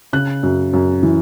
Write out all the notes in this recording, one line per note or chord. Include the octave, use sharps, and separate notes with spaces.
C#3 F#6
F#2
F#2
E3